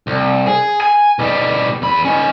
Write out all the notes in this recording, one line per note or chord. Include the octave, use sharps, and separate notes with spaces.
C2
G#4
G#5
B2 G3
E2 B5
C#4 D#4